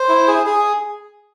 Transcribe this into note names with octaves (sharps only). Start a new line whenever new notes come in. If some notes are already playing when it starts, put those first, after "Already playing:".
Already playing: C5
E4
G#4
G#4